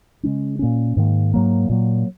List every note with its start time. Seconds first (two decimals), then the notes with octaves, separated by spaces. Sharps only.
0.23 C#3 G#3 C#4
0.59 A#2 A#3 C#4
0.97 G#2 D#3 A#3
1.34 G#2 F#3 A#3
1.69 A#2 F#3 A#3